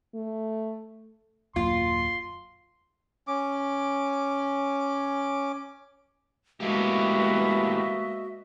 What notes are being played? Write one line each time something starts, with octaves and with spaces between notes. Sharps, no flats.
A3
D#1 F#2 A#3 F4 C6
C#4 D6
A2 G#3 A#3 B3 F#4 G4 D#5 E5